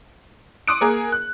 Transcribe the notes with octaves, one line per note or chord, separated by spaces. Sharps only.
C6 D6 D#6 F#6 C#7 D7
A#3 G#4 A#4
F#6